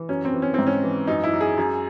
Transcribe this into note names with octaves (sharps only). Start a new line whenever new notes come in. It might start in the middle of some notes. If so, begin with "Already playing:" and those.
Already playing: E3
F#2 C#4
C4
E3
C#4
G#2 C4
C#4
E3
F#2 D#4
E4
F#2
G#4
F#2